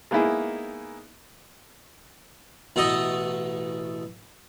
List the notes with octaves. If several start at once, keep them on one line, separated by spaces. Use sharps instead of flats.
G#3 A#3 B3 D#4 E4 G#4
A1 B2 A3 A4 D#5